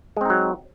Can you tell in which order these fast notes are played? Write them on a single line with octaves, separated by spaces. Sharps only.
G#3 C4 D#4 F#3